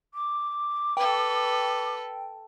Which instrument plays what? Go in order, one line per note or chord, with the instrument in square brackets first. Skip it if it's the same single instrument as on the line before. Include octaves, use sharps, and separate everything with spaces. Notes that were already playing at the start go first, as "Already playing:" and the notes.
[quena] D6
[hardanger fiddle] A4 B4 [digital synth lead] G5